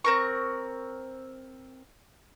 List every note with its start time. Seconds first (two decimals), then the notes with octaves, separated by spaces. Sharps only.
0.04 C4 A#4 C#6